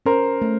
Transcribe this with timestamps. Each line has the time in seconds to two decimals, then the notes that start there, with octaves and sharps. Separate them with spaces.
0.06 C#4 A#4 C5
0.42 A3